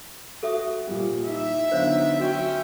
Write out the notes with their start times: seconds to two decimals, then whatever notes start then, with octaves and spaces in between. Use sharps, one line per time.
0.43 F#4 A4 E5 D#6
0.87 A#2 F3 G3
1.24 D#4 E4 E5
1.72 D3 F#3 B3 D#4 C5 C#5 F5
2.20 C#4 F#4 E5 G5